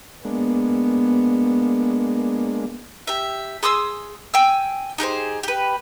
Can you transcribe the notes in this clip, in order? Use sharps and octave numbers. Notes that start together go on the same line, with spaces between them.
G#3 A#3 B3 D4
G4 E5
G#4 C6 D#6 E6
G5 G#5 E6
D#4 G4 G#4 C5
G4 B4